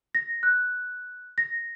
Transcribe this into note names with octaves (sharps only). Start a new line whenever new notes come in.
A#6
F#6
A#6